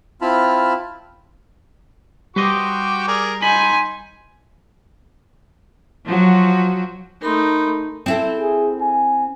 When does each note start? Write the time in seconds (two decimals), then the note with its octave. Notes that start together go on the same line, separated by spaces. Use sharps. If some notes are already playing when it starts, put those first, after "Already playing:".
0.22 C4 E4 F4 A5 B5 F6
2.36 G3 F#4 G4 B4 C5 D#5 D6
3.08 G#4 A#4 D5
3.42 D#4 C5 G#5 B5
6.06 F3 F#3 F#4
7.22 A3 D#4 A#4 B5 C6
8.06 C4 E4 A4
8.39 G#4
8.81 G#5